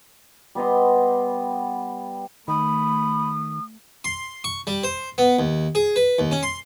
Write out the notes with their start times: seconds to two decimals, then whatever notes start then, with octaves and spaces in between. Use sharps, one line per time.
0.55 G3 B3 D#5 C6
2.48 D#3 A3 B5 D#6
4.04 C6
4.44 C#6
4.67 G3
4.83 C5
5.18 B3
5.39 D#2
5.75 G#4
5.96 B4
6.19 D#2
6.31 C#4
6.43 C6